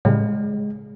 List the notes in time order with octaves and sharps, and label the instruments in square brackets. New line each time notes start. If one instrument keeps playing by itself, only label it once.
[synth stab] A2 C#3 G3 [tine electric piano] G#3